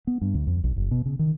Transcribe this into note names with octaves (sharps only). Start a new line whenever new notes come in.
B3
G2
D2
F2
B1
F#1
B2
C#3
D#3